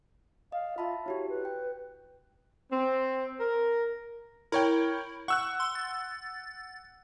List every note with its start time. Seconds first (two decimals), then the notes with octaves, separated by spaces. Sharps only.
0.52 D#5 F5
0.78 F4 E5 A5 B5
1.06 E4 F#4 G4 C#5
1.29 B4
1.45 G5
2.72 C4
3.40 A#4
4.52 E4 A#4 C#5 G5
5.28 F#5 C#6 E6 F#6
5.60 C6
5.75 A6